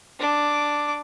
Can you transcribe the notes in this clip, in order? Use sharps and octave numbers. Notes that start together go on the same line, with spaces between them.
D4 D6